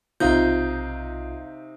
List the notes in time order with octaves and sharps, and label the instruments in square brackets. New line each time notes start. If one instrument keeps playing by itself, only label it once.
[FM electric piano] B1 F4 [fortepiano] C3 D#4 [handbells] F5 G6